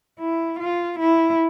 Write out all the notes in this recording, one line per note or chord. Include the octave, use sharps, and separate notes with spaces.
E4
F4
E4